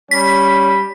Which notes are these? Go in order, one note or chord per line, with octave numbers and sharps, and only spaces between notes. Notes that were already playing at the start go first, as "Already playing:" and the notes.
G3 C#4 B6